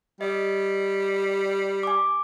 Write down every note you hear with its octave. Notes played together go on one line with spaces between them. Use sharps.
G3 D#5
G#5 D6